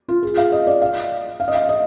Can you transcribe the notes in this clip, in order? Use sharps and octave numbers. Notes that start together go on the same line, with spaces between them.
F4
G#4
F5
D#5
D5
F5
F5
D#5
F5
D#5